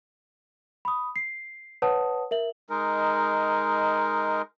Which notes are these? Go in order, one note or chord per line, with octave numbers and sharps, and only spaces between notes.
B5 D#6
C7
B4 C#5 F#5 A5 D#6
A#4 E5 F#7
G#3 D#4 A#4